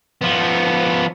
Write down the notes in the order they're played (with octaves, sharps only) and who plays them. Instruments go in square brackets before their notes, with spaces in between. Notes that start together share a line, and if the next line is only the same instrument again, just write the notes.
[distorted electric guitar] F3 B3